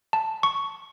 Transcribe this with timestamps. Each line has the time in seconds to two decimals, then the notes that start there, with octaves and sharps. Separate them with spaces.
0.13 A5
0.43 C#6